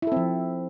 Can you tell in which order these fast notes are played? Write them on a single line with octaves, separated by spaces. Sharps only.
E4 A4 C4 F3